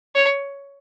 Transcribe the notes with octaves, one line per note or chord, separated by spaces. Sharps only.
C#5